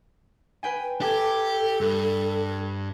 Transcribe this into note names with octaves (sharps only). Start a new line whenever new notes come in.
B4 G5 G#5
G4 A4 A5 D6 G#6
G2